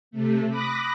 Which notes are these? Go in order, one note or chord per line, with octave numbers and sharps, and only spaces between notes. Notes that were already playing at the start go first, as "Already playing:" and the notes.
C3 A3
B5 D6 D#6 F#6 A#6